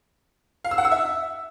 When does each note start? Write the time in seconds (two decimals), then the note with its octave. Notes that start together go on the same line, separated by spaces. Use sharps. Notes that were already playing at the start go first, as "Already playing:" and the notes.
0.64 F5
0.71 E6
0.78 F#5
0.85 E6
0.92 E5